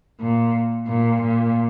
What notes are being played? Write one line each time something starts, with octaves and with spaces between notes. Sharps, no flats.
A#2
A#2
A#2